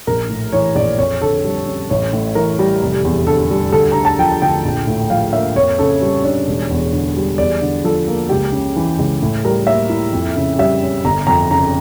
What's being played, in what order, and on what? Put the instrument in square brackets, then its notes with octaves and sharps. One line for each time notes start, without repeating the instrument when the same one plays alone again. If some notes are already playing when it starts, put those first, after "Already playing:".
[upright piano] A#1 A#4
A2
E3 C#5
A#1 D5
F2 C#5
D3 A4
G3
C#4
A1 C#5
A2
E3 A#4
G3
F1
E2
D3 A4
G3
D2 A4
D3 A#5
A5
F3 G5
D2 G5
A#1
A2
F3 F5
A#3 E5
F2 C#5
C#3 A4
G3
D4 C#5
E1
E2
D3
G3
E2 D5
D3
F3 A4
A#3
C#2 G4
C#3
E3
C#2
A2
G3 A#4
A#3 E5
E4
F2
C#3
G3 E5
C#4
G1 A#5
F2 A#5
C#3 A#5